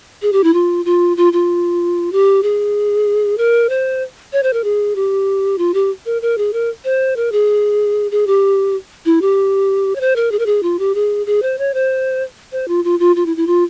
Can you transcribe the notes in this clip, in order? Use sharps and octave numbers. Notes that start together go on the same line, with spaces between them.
G#4
G4
E4
F4
F4
F4
F4
G4
G#4
A#4
C5
C#5
C5
A#4
G#4
G4
F4
G4
A#4
A#4
G#4
A#4
C5
A#4
G#4
G#4
G4
E4
G4
C#5
C5
A#4
G#4
A#4
G#4
F4
G4
G#4
G#4
C5
C#5
C5
C5
F4
F4
F4
F4
E4
E4
F4